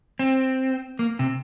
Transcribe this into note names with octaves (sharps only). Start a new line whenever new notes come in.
C4
A#3
C3